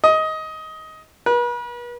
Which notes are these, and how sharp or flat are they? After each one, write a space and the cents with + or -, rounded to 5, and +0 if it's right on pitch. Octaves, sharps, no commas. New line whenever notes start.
D#5 +15
B4 -40